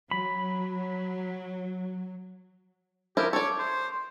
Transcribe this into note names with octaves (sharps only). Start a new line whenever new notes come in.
F#3 B5
F3 E4 G4 A#4
A4 C#5 D5
C5